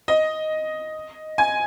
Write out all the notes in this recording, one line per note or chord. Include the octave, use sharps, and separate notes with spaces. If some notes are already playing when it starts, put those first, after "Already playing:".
D#5
G#5